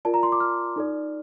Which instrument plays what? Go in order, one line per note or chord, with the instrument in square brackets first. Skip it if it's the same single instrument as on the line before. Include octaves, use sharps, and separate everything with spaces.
[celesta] F4 A#4 D5 A5
A#5
C6
D6
F6
D#4 A4 D5